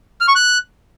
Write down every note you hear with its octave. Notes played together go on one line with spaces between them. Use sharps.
F6
C#6
F#6